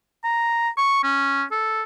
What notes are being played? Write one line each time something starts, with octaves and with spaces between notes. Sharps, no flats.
A#5
C#6
C#4
A4